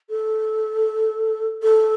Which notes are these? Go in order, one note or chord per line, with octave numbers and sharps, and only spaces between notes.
A4
A4